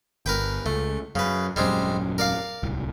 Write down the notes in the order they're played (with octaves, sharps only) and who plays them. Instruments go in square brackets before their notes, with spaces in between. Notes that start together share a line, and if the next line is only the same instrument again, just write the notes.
[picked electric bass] G1 [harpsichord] A#4 B4 G5
[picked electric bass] C#2 [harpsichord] A3
[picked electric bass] F#2 [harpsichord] C#3 B4
[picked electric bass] D#1 F#2 [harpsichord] G3 G#3 C4
[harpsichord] A#4 D5 F5
[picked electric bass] D1 C2